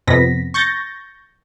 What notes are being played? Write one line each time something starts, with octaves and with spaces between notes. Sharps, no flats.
F2 C3 B3 A#6 B6
C#6 G6 A6 A#6